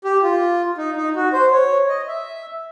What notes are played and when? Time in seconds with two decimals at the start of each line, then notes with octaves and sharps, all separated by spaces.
0.05 G4
0.23 F4
0.78 D#4
0.96 D#4
1.16 F#4
1.33 C5
1.52 C#5
1.89 D#5
2.07 E5